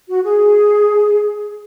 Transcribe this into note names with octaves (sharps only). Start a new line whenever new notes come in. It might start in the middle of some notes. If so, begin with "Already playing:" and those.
F#4
G#4